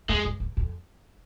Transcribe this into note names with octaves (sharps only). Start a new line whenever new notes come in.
F2 G#3
G2
G2
F2